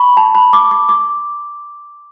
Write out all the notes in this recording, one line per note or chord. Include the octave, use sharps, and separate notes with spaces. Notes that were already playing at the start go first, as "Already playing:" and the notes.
Already playing: B5 C#6
A5
B5
D6
D6
D6